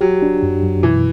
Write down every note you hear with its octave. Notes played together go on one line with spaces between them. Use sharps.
F#3 G4
D4
F#2
F#2
B2 E3